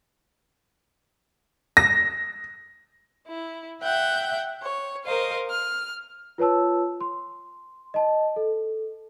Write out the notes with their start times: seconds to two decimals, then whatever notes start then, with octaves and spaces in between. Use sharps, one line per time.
1.77 A#6
3.27 E4
3.82 E5 F#5 G5 G6
4.61 C#5
5.05 A#4 C5 D#5 F5
5.50 F6
6.38 F4 B4 C#5 A5 E6
7.01 C6
7.94 D#5 A5
8.36 A4